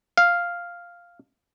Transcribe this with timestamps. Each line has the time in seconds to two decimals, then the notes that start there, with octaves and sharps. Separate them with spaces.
0.18 F5